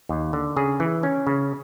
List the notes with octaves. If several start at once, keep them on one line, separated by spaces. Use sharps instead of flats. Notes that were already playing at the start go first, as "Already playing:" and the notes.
D#2
D3
C#3 G#4
E3
C#4
C#3